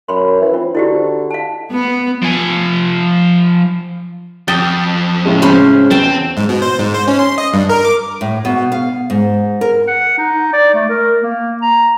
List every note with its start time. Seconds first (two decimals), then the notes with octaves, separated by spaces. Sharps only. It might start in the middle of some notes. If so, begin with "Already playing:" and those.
0.08 F#2 B5 C6
0.41 E3
0.54 C4 F4
0.75 D3 E4 F#4 G4
1.31 F5 A5
1.72 B3
2.22 F3 G#5
4.48 F2 G5 D6 D#6 A6
5.25 A2 C#3 G#3
5.42 C#4 C5 B5
5.91 E2 C4 G5 A5
6.37 G#2
6.49 B2
6.62 C5
6.79 G#2
6.94 C5
7.08 C#4
7.19 C6
7.38 D#5
7.54 G2
7.69 A#4
7.85 D6
8.21 A2
8.45 B2
8.72 F5
9.10 G#2
9.61 A#4
9.87 F#5
10.18 D#4
10.53 D5
10.74 A3
10.89 A#4
11.23 A#3
11.62 A#5